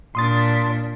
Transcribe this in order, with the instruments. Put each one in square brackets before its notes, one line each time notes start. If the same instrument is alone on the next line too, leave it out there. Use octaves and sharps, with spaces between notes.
[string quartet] A#2 D4 [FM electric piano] C6 D#6 A6